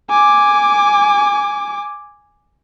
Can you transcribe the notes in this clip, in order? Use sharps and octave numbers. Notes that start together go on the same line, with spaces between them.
G#5 D6